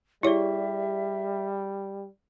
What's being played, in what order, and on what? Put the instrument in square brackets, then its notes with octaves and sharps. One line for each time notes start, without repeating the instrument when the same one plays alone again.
[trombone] G3 [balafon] E4 C#5 [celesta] G4 G#4 D5 [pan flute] E5